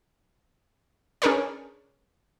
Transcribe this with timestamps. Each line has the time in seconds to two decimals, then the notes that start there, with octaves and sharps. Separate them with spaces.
1.22 C#4 D4 G#4 A#4 B4 C#5